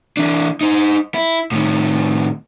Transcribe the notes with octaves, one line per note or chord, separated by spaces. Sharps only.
E3 D4
D#4 C5
E4
A2 D#3